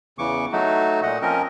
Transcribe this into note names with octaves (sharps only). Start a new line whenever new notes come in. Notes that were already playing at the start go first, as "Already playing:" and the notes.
E2 C#3 E3 C#6 D6
F#3 A3 D#4 F#4
A#2 D#5 F#5
F3 C4 C#4 A#4 D#5